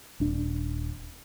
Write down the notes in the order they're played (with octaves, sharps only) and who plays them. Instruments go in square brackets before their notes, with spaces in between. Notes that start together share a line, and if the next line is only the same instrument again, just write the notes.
[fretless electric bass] D#1 D4